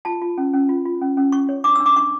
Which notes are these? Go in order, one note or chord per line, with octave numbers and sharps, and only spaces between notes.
F4 A5
F4
C#4
C#4
F4
F4
C#4
C#4
C#4 C#6
C#5
D4 D6
E6
D4
D6
D4 C#6